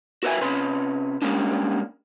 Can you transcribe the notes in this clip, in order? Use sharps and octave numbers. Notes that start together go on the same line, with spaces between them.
F#4 A#4 B4 D5 E5 G#5
C3 C#4 B4 C6
G3 G#3 A#3 C#4 D4